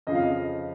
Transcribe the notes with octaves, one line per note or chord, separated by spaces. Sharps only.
F2 C#3 F3 D#5
F5
D#5